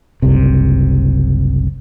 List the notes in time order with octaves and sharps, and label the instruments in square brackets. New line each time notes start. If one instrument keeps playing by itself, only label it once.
[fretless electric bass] F#1 C2 C3